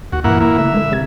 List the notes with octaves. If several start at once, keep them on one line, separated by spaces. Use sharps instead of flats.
D#2 F#4
G2 A#2 E3 A#3 E4 F#5
A#3 E4
C#3 A3 E5
D3 G#3 A3
C3 G#6